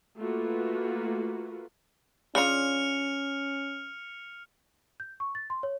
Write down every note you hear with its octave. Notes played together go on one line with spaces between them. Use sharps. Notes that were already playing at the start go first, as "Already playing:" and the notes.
A3 A#3 F4 F#4 B4
C#3 C#4 D4 F4 F6 C#7 F7
G6
C#6
A6
C6
C#5